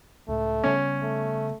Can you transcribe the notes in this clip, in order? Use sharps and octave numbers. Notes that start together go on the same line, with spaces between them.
C#2 A2 A3
C#3 G3 B3 C#4
A3